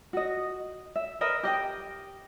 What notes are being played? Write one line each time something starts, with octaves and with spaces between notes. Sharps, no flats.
F#4 D#5
E5
A#4 B4 D#5 E5
G4 D#5 G5